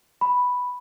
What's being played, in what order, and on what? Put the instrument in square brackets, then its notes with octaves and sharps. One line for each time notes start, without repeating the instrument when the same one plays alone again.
[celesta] B5